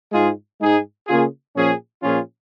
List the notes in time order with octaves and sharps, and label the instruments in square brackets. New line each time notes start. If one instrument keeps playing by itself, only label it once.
[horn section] G#2 G#3 F4 G#4
G#2 G#3 D#4 G#4
C#3 A#3 C#4 F4 G#4
A#2 F3 C#4 G#4
A#2 F3 C#4 F4 G#4